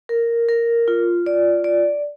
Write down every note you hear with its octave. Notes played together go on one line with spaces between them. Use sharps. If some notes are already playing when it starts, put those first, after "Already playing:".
A#4
A#4
F4
D5
D5